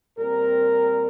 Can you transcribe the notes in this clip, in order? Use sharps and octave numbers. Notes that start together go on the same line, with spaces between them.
A#2 G3 C4 A#4